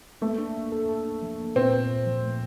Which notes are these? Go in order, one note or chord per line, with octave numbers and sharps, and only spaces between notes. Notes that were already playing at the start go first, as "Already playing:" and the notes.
A3 A#3
D4
A#3
A4
A4
D4
F3
A#3
A#2 C4
A#2
A#2
F3
A3